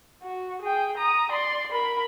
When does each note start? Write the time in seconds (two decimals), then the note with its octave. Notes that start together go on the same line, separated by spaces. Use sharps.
0.23 F#4
0.62 G#4 G5
0.97 A#5 D#6
1.32 D5 C6
1.72 A#4 B5